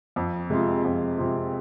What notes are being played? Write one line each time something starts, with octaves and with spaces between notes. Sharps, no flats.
F2
C3 G#3 C4 F4
F2
C3 G#3 C4 F4